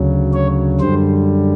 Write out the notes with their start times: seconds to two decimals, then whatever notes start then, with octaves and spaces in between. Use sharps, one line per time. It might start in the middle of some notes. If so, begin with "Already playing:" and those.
Already playing: D2 C#3 F#3
0.34 C#5
0.80 F#2 D3 G3 C5